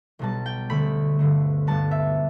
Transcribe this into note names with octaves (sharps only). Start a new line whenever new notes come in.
B1 B2 G3 A5
G5
D2 D3 A3 B5
G2 D3 A3
G2 G3 B3 A5
E5